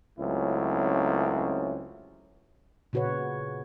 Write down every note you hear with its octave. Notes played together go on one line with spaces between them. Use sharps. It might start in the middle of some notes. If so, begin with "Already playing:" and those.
C#2 F#3 A3 C4 C#4 E4
A#2 C#3 F#4 B4 C#5